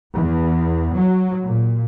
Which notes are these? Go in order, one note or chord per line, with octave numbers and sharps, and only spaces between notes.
E2
F#3
A#2